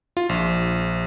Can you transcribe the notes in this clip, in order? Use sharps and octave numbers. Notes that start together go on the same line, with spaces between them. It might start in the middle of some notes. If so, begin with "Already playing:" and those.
F4
A#1